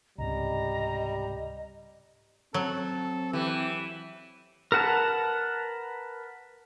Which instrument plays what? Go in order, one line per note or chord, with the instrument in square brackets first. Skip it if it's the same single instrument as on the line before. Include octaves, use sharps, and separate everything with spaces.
[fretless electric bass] C#2 G#2 C3 [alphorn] G3 [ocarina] D#5 [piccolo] A#5
[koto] F#3 [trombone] C4 [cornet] A4
[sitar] E3 [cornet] G4
[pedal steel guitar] A#4 B4 F#5 A5